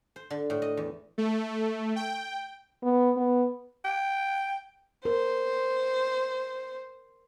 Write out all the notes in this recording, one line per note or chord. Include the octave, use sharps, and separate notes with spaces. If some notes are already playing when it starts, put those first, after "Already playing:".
C5
D3
A2
D#5
E2
A3
G5
B3
B3
G5
A#4 C5